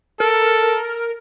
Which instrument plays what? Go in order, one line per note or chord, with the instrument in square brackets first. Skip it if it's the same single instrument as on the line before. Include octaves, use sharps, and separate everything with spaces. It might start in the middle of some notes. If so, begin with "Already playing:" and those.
[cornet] A4 [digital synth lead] A#4